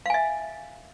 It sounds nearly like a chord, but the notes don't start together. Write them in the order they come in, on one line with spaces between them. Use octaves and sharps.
F5 G#5 E5